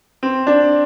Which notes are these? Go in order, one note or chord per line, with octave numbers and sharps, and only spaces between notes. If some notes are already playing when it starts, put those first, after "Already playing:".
C4
D4